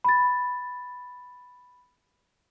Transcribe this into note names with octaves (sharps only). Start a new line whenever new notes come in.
B5 A6